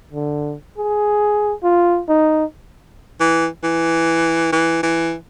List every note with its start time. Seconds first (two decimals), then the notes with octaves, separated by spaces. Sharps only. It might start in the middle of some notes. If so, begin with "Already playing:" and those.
0.11 D3
0.78 G#4
1.63 F4
2.08 D#4
3.20 E3
3.63 E3
4.52 E3
4.83 E3